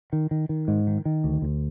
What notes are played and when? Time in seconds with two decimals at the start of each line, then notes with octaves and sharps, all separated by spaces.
0.13 D#3
0.31 D#3
0.49 D#3
0.68 G#2
0.87 D#3
1.05 D#3
1.24 D2
1.42 D2